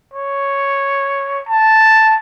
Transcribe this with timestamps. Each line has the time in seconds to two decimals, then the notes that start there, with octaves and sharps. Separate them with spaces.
0.14 C#5
1.48 A5